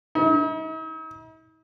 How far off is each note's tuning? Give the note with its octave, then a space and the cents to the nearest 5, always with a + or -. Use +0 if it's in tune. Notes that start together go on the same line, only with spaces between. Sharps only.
D#4 +45